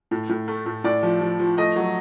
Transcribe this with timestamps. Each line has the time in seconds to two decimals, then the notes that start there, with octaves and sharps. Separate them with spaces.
0.11 A2
0.29 A2
0.48 A3
0.66 A2
0.84 A2 D5
1.03 F3
1.21 F3
1.39 F3
1.58 A3 D#5
1.76 F#3